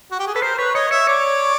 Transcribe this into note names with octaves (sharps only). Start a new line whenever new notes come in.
F#4
G4
G#4
A4 B4
A#4 C5
B4 C#5
C#5 D#5
C#5 E5
C#5 D5